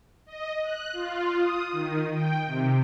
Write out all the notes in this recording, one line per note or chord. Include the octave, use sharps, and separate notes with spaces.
D#5
F#6
F4
D#6
D#3
G5
C3